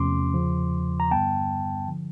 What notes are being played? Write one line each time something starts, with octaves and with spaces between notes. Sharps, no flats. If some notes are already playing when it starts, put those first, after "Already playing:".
Already playing: E2 C3 F3 A3 C#4 C6 D6
E2 C#3 F3
A#5
G2 D3 G3 B3 G5 A5
D3 F3